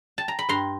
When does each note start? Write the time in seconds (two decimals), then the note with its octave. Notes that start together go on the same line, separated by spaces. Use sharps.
0.18 A5
0.28 A#5
0.39 B5
0.49 G2 A#5 C6